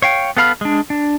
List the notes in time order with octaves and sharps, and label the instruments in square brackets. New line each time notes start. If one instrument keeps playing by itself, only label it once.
[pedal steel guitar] C#5 F5 G5
B3 A4 F5 B5 F6
G#3 D4
D4